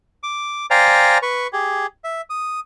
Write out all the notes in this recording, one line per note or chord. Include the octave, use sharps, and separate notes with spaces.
D6
C5 D5 F5 G5 G#5 A#5
B4 C#6
G4 G#4
E5
D#6